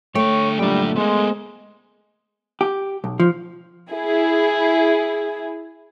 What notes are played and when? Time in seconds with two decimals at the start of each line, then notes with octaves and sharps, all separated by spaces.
0.15 D3 A3 C#5 G5
0.59 F#2 A#2 D3 G3 D4 G5
0.96 G#3 B3 A#4 C5
2.61 G4
3.04 B1
3.20 F3
3.92 E4 G#4